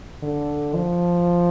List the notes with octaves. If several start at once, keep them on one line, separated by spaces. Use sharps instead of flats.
D3
F3